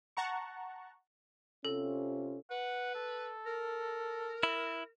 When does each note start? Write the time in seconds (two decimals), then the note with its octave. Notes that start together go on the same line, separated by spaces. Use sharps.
0.17 F#5 A5 A#5 C#6
1.65 C3 C#4 F4 A4
2.51 B4 F#5
2.95 A4
3.46 A#4
4.43 E4